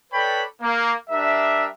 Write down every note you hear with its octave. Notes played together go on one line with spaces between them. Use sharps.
A4 B4 C#5 D5 G5 B5
A#3
G3 D4 A#4 E5